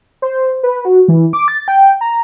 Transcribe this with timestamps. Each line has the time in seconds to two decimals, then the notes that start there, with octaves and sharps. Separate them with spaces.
0.22 C5
0.63 B4
0.85 F#4
1.08 E3
1.33 D6
1.48 A6
1.68 G5
2.01 A#5